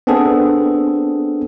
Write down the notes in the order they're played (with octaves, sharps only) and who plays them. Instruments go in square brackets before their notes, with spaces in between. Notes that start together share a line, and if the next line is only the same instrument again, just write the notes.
[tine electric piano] B3 C4 D4 G#4 A4